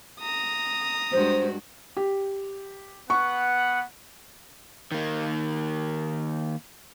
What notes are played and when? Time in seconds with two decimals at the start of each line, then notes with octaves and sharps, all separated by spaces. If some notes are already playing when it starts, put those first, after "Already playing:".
0.20 A#5 D#6
1.11 G2 G#3 F#4 C5
1.97 G4
3.10 B3 F#5 C#6
4.92 D#3 A#3